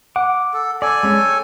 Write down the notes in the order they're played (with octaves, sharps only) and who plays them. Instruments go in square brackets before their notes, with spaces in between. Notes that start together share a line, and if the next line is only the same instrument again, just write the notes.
[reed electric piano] F#5 [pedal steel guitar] D6
[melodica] A4
[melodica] A4 G#5 [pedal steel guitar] D5
[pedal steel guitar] G#3 C#4
C#5 G5